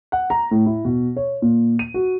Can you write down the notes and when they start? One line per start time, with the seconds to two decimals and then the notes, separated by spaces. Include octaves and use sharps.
0.12 F#5
0.30 A#5
0.51 A2
0.66 E4
0.85 B2
1.16 C#5
1.42 A#2
1.79 D#7
1.94 F#4